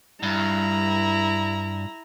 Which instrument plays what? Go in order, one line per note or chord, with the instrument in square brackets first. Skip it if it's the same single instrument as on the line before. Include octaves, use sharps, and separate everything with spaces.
[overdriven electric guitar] G2 [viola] E4 A#5